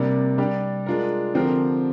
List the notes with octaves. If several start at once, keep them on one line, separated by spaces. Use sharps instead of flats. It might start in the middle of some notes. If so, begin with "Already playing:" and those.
Already playing: C3 G3 A#3 D4
G3 D4 G4
G#3 D4 F4 A#4
D3 F3 C4 G4 A#4